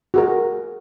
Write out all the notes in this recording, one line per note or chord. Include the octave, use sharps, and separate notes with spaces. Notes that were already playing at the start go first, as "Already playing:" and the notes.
F#4 G#4 A#4